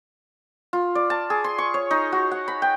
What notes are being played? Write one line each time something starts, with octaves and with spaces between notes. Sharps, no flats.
F4
D5
A5
G#4
C6
C#6
C#5
D#4
F#4
F#5
B5
G5